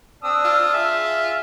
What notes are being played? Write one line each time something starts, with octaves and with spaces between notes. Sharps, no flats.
C4 D4 D#6 E6
F4
G#4 E5